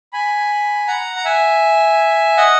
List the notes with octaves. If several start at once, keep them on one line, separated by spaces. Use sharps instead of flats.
G#5 B5
F#5 A#5
A#5
E5 G#5
D#5 F#5